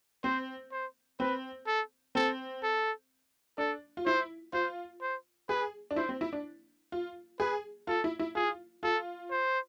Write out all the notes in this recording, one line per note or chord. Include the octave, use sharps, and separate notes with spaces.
C4 C5
C5
C4 B4
A4
C4 A4
A4
D4 A4
F4
E4 C5
F4 C5
C5
G#4 B4
D4
E4 C5
C4
E4
D4
F4
G#4 B4
F4 A4
E4
E4
F4 G#4
F4 A4
C5